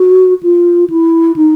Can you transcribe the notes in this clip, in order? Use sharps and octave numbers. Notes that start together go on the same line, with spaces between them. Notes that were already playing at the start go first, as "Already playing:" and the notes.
Already playing: F#4
F4
E4
D#4